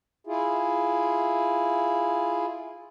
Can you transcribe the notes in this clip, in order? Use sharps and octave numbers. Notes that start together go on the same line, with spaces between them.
E4 F4 G#4